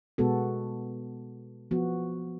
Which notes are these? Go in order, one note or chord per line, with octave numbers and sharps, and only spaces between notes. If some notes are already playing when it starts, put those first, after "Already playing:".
B2 G#3 B3 F#4 A4
F3 B3 F#4